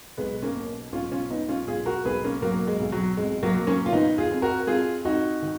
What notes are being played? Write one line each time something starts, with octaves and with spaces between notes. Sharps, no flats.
B1 G#3 B3
A#3 C#4
B2
B1 C#4 F4
C#4 F4
B2 B3 D#4
C#4 F4
B1 F4 G#4
F#4 A#4
B1 G#4 B4
A#3 C#4
F#3 A#3
G#3
B1
F#3
F2 G#3
F#3 A#3
F#3
A#3 C#4
F4
D#3 B3 D#4
F4 G#4
F2
F#4 A#4
F2 F4 G#4
F2 D#4 F#4
D#3